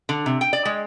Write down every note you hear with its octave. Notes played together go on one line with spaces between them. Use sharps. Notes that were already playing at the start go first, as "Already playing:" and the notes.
D3
C3
G5
D5
G#3